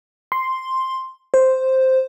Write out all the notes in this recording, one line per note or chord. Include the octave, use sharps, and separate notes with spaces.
C6
C5